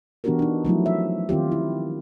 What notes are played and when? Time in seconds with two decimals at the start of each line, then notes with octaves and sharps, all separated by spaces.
0.24 E3 B3 D4 F#4 G4 A#4
0.39 D4 D#4
0.65 F3 F#3 A3 E4
0.86 E5
1.29 D#3 C4 F4 G4
1.52 E4